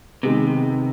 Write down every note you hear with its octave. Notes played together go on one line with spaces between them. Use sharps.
C3 D#3 G#3 B3